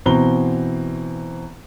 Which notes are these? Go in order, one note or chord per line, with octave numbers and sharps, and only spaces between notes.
B2 E3 C4 A#5 G7